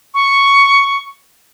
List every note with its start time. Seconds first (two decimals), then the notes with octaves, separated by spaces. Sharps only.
0.14 C#6